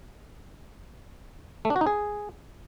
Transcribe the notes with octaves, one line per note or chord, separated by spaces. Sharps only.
A3
D4
F#4
D#4
G#4